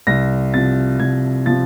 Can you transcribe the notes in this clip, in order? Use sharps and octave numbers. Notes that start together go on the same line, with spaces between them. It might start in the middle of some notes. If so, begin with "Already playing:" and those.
C2 A#6
C3 F3 A6
C2 G#6
C3 F3 A6